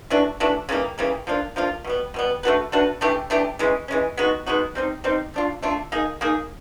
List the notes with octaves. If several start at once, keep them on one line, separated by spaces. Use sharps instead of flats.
E3 A3 D4 F#4
E3 A3 D4 F#4
C#3 E3 G3 A#3
C#3 E3 G3 A#3
F3 A#3 D4 F4
F3 A#3 D4 F4
B2 G3 B3
B2 G3 B3
A3 D4 F#4 B4
A3 D4 F#4 B4
E3 A3 D4 G4
E3 A3 D4 G4
E3 G#3 C#4
E3 G#3 C#4
G#3 B3 D#4 F#4
G#3 B3 D#4 F#4
G3 C4 D#4
G3 C4 D#4
A3 D4 F4
A3 D4 F4
A#3 D#4 G#4
A#3 D#4 G#4